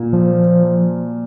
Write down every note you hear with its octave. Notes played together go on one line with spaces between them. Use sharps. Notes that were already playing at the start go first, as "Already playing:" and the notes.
Already playing: A#2 A#3
F3